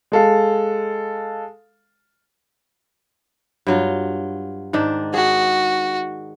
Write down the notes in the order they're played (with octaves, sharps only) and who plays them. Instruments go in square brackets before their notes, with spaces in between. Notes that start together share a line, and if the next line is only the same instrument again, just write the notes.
[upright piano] G#3 A4 F5
[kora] G2 F#3 F4
G#2 D#3 D4
[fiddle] F#4 [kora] G#4